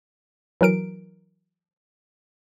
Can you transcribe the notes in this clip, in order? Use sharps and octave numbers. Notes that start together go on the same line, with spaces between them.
E3 F#3 A#4 D7